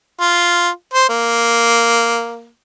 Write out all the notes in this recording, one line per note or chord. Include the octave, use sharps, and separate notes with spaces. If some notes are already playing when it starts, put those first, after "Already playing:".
F4
C5
A#3